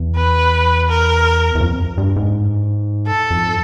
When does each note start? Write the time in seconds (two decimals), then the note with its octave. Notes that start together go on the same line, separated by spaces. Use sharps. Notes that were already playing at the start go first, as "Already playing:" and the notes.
Already playing: E2
0.15 B4
0.88 A#4
1.55 E2
1.61 F2
1.98 G2
2.16 G#2
3.07 A4
3.31 F2